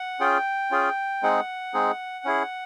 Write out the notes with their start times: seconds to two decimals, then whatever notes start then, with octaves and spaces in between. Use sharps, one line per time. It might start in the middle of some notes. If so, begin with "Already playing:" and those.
Already playing: F#5
0.20 C#4 F4 G#4 G5
0.71 C#4 F4 G#4
1.23 G#3 C4 D#4 G#4 F#5
1.74 G#3 C4 D#4 G#4
2.25 C#4 E4 G#4